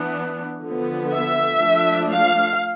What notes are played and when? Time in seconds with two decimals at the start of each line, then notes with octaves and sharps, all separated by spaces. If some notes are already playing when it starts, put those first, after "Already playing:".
Already playing: E3 B3 D4
0.64 D3 F3 B3
1.12 E5
1.61 F3 A3 D4
2.10 F5